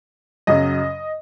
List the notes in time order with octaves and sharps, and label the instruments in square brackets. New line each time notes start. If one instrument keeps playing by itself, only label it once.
[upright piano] F#2 C#3 F#3 D#5